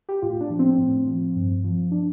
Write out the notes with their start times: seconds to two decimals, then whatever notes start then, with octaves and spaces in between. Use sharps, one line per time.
0.09 G4
0.22 A2 F4
0.41 D4
0.50 F3
0.59 C4
0.78 A2
1.07 F3
1.36 G2
1.64 F3
1.92 D4